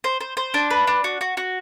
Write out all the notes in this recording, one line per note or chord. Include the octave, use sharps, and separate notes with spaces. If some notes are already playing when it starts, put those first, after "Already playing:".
C5
C5
C5
D4
B4
D4
F#4
F#4
F#4